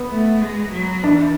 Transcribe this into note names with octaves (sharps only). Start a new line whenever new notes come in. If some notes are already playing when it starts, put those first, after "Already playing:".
Already playing: B3
A3
G#3
F#3
E3 D4